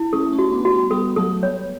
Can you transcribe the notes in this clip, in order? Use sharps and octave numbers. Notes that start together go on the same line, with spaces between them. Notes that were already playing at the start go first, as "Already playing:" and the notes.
Already playing: E4
A3 C#4 A4
A3 C#4
F#4
B3 D4
F#4
G3 B3
G3 B3 A4
F#3 A3 A4
G3 B3 C#5